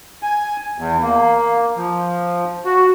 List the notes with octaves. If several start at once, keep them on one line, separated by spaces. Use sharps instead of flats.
G#5
E2
A#3
F3
F#4